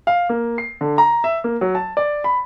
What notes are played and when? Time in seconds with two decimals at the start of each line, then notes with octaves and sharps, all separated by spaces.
0.07 F5
0.29 A#3
0.58 C7
0.81 D3
0.98 A#5
1.24 E5
1.44 A#3
1.61 F#3
1.75 A5
1.97 D5
2.24 B5